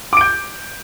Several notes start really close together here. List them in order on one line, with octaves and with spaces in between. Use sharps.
D6 D7 G6